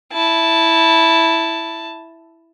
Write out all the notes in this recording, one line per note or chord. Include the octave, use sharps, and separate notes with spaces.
E4 A5